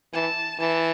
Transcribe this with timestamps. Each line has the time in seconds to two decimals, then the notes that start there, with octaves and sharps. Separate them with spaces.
0.13 E3 A5
0.59 E3 A5